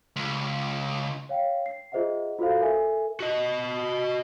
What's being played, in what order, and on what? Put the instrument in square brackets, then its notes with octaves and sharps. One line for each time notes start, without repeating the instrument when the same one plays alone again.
[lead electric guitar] C#2
[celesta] C#5 F5 G5
C7
F4 G#4 C5 D#5 E5 F#5
F4 F#4 A4 C5 F5
A4 A#4 E5 G#5
[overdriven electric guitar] F#4 D#5